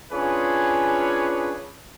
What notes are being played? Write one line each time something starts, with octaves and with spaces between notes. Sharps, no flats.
C#4 D4 F4 G#4 B4 C#5